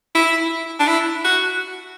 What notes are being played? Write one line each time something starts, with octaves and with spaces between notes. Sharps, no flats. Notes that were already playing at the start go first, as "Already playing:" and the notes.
E4
D4
E4
F#4